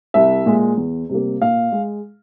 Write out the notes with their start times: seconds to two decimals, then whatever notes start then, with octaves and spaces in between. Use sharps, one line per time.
0.14 C2 E5
0.46 A#2 G#3
0.77 E2
1.09 C3 G3 A#3
1.41 A#2 F5
1.72 G#3